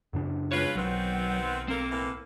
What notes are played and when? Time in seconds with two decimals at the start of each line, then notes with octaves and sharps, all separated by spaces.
0.13 F#2 C#3 D4
0.52 G#3 F4 B4 C#5
0.75 B1 D#3 F#3 B3 C4
1.68 A#3 C4 A4
1.90 A2 E3 A#3